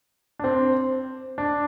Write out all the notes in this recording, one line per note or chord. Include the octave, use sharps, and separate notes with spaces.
D4
C4
D4